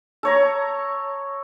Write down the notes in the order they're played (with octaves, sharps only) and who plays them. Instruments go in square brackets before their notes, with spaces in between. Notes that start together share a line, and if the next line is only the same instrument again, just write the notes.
[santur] A4 C#5 A#5